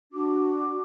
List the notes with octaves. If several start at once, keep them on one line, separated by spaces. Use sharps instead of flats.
D4 F#4 D6